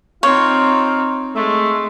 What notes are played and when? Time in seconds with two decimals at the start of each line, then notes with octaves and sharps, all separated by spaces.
0.23 C4 D#4 F4 C#5
1.35 G#3 A3